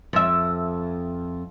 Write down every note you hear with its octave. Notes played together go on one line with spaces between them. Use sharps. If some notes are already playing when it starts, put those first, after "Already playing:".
F2 E5